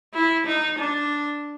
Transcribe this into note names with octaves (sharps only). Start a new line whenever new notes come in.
E4
D#4
D4